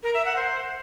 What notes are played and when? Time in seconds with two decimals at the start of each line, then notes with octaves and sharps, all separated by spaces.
0.03 A#4
0.14 E5
0.25 F#5
0.36 C5